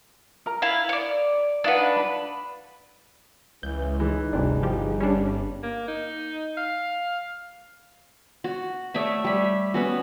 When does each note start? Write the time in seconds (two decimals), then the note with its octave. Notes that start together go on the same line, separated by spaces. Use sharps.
0.46 A#4 A#5
0.62 E4 F5
0.89 C#5 D5
1.64 D4 D#4 B4 F5 F#5
1.96 B5
3.63 C#2 E3 G6
4.00 E3 D#4 G#4
4.33 G1 D2 C3 D4
4.63 F3 G4
5.00 G3 C#4 D4
5.63 A#3
5.88 D#4
6.57 F5
8.44 F#4
8.94 A3 C#5 D5 E5
9.24 G3 E5
9.74 B3 C#4 F#4